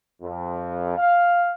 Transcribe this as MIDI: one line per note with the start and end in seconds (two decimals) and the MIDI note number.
0.22 0.96 41
0.97 1.51 77